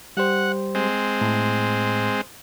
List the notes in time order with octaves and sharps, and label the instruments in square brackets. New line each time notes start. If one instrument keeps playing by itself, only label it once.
[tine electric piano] G3 G4 C5 [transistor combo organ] F#5
[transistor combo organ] G#3 C4
[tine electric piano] A2